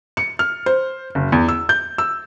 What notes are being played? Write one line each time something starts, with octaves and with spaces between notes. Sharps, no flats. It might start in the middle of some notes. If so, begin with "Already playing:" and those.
C#7
F6
C5
F#1
E2
E6
G6
E6